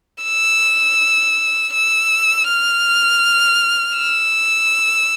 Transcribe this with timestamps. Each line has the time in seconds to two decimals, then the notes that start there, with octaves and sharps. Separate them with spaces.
0.23 E6
1.73 E6
2.48 F6
3.97 E6